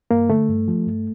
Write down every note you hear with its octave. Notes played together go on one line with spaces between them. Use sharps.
G2 A#3
D3 A3
G2
F3
G2